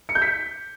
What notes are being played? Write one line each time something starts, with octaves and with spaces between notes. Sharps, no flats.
C#7
G6
B6